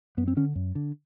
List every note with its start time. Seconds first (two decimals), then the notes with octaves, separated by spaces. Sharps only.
0.17 F#2 B3
0.28 C4
0.37 D3 C#4
0.55 F#2
0.75 D3